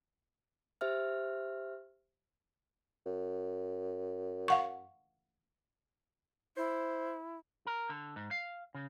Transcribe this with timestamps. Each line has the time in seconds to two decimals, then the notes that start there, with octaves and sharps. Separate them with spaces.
0.81 G4 C5 E5 F6
3.06 F#2
4.48 F5 F#5 C#6
6.57 E4 C5
7.67 A#4
7.89 D3
8.16 G#2
8.31 F5
8.74 C#3